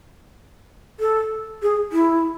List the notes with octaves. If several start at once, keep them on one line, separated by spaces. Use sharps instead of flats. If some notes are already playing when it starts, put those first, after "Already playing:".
A4
G#4
E4